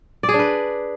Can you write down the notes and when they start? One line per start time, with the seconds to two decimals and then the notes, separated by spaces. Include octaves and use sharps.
0.23 D5
0.29 G#4
0.34 D4
0.39 B4